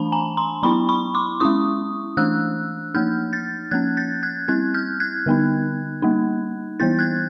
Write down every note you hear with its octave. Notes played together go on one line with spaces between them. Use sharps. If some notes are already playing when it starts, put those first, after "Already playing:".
Already playing: E3 A3 D4 A5 B5
G#5 A#5
A#5 C6
F#3 B3 E4 B5 C#6
B5 C#6
C6 D6
G#3 C#4 E4 C#6 D#6
E3 A3 D4 E6 F#6
F3 A#3 D#4 F6 G6
G6 A6
F3 A#3 C#4 F#6 G#6
G6 A6
F#6 G#6
G3 C4 E4 F#6 G#6
F6 G6
F#6 G#6
D3 G3 B3 D#4
G3 A#3 D#4
E3 G3 B3 E4 G6 A6
F#6 G#6